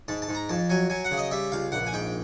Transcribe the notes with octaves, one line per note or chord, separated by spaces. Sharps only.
G#2 A5
A5
G#2
A#5
F2 A5
F#3 G#5
F#3 G#5
F#5
C#3
D#5
G3 E5
C#2 F5
A#1 F#5
G#5
G#2 G5